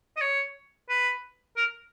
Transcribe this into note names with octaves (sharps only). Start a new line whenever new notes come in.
D#5
C#5
B4
A#4